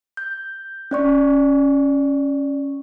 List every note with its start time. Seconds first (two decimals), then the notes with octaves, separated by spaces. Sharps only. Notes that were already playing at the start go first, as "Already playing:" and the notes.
0.17 G6
0.91 C#4 D5 C#6